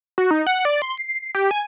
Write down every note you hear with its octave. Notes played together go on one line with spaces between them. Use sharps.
F#4
D#4
F#5
D5
C6
C7
G4
G#5